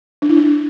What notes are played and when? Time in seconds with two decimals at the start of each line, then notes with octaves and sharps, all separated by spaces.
0.22 D4
0.29 E4
0.37 D4